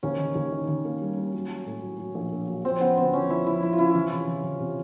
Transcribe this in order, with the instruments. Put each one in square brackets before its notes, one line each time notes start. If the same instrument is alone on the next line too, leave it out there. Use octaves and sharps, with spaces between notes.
[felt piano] D#2 [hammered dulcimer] C#4
[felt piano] D#3
D#2
D#3
D#3
A#3
G3
A#3
F#3
F#3
A2
F#3
F#3
A#1
A#3
F#3
[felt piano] F3 [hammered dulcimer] C4
[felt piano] C#3 [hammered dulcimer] B3
[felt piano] D2 [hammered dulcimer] C4
[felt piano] F3 [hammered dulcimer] C#4
[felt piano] F3 [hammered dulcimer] E4
[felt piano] C#3 [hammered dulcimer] E4
[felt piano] F3 [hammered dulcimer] E4
[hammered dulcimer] F4
[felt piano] C#3 [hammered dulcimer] E4
[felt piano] E3 [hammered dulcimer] F4
[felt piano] C3
E3
E3
C3